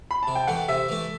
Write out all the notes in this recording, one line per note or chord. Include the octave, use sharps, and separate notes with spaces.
B5
C3 A5
G5
E3 A3 F#5
C3 E5
E3 A3